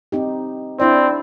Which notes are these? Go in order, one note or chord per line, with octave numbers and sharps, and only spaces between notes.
C4 D#4 G4
C4 D4 E4 D5